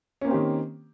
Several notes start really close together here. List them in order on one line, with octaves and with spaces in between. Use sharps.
C#4 A#3 C4 G4 D#3